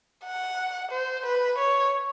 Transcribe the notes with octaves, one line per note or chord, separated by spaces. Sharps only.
F#5
C5
B4
C#5